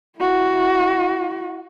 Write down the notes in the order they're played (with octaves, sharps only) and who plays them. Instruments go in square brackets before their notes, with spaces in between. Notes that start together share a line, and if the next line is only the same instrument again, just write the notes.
[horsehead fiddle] E4 F#4